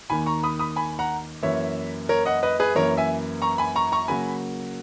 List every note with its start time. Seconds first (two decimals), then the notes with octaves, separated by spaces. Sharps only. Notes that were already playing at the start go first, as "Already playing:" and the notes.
0.10 D#2 D#3 A#3 G#5 B5
0.26 A#5 C#6
0.43 B5 D#6
0.59 B5 D#6
0.76 G#5 B5
0.99 F#5 A#5
1.43 F#2 E3 A#3 C#5 E5
2.09 A#4 C#5
2.26 D#5 F#5
2.43 B4 D#5
2.60 G#4 B4
2.75 F#2 E3 A#3 A#4 C#5
2.97 E5 G#5
3.42 A#5 C#6
3.58 G#5 B5
3.76 A#5 C#6
3.92 A#5 C#6
4.08 C#3 F#3 A#3 G#5 B5